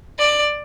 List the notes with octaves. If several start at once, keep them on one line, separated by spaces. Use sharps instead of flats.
D5